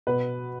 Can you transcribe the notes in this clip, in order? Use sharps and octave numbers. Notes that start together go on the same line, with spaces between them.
B2 B4